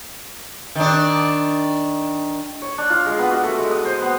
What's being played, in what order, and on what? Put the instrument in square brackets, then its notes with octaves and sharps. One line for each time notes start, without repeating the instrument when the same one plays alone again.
[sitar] D#3 D4
[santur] C#5
D4
F4
G#3
B3
F#4
A3
G#3
D#6
C5
B3